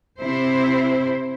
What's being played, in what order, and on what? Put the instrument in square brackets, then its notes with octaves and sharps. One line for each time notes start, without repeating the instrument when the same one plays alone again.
[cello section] C3 E4 C5